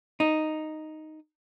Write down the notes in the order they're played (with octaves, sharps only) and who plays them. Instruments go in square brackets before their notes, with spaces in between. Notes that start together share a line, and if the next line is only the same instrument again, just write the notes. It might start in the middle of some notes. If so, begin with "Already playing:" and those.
[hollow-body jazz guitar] D#4